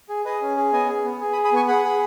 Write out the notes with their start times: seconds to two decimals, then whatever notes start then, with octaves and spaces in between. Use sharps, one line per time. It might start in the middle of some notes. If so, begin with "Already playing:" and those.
0.09 G#4
0.25 G#4 B4 D#5
0.42 C#4
0.57 G#4
0.73 B3 D#5 G#5
0.89 G#4
1.04 B3
1.21 G#4
1.33 B5 D#6
1.37 G#4
1.45 B5 D#6
1.52 B3 G#5 C#6
1.68 G#4 F#5 B5
1.85 G#4